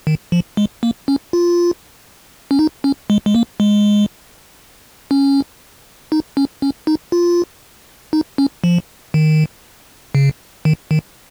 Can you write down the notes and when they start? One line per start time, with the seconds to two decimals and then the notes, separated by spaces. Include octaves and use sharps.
0.07 D#3
0.32 F3
0.57 G#3
0.83 A#3
1.08 C#4
1.33 F4
2.51 C#4
2.59 D#4
2.84 C#4
3.10 G#3
3.26 G#3
3.35 A#3
3.60 G#3
5.11 C#4
6.12 D#4
6.37 C#4
6.62 C#4
6.87 D#4
7.12 F4
8.13 D#4
8.38 C#4
8.64 F3
9.14 D#3
10.15 C#3
10.65 D#3
10.91 D#3